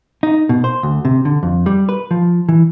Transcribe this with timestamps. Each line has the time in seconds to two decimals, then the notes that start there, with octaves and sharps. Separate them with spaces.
0.23 D#4
0.49 B2
0.64 C5
0.83 D2
1.05 C3
1.25 D3
1.43 F2
1.66 G3
1.89 B4
2.11 F3
2.49 E3